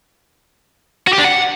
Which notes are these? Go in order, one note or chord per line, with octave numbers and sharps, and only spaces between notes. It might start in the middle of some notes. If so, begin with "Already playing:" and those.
F#4
G4
D4
F#5